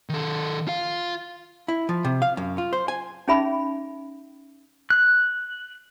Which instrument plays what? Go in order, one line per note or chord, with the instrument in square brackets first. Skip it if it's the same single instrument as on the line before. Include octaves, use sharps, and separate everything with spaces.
[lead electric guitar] D#3 A4
F4 F5
[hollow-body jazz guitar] E4
F3
C3
F5
F#2
F4
C5
G#5
[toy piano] C#4 D#4 G#4 E5 B5
[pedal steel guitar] F#6